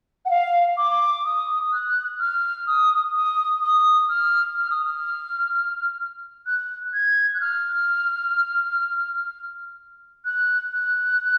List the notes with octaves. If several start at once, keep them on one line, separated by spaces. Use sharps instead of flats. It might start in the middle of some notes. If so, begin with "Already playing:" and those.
F#5
F5
D6
D#6
F#6
F6
D#6
D#6
D#6
F6
F6
D#6
F6
F#6
G#6
F#6
F6
F#6
F#6